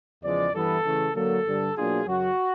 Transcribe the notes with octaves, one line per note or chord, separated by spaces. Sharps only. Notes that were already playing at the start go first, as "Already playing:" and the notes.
E2 C#3 F3 G#3 D5
G2 E3 G3 B3 E4 A4
C#3 E3 A3
D3 F#3 A#3 A4
G2 D3 G3
B2 F#3 A#3 D4 F4 G#4
F#2 C#3 F#3 F#4